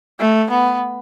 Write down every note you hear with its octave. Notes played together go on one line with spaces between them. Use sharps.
A3
B3